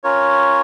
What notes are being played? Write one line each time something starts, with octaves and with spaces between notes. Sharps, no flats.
C#4 F4 A#4 C#5